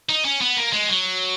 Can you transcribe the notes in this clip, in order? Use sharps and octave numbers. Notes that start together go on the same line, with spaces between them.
D#4
C#4
B3
A#3
G#3
F#3